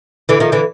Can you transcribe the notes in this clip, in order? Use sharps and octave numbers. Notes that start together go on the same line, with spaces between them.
D3 E3
D#3 F3
D3 E3